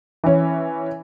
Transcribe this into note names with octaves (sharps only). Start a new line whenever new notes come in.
E3 C#4